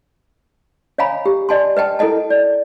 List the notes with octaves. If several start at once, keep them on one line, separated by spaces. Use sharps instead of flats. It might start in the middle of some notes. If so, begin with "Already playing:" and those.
C#5 D#5 F5 G#5 A#5 B5
G4
D5 D#5 G#5 A5 C6
B4 D#5 G5 A5
E4 A4 A#4 D#5 A5
D5